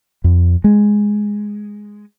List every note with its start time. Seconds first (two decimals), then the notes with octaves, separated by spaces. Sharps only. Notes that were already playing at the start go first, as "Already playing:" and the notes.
0.24 F2
0.64 G#3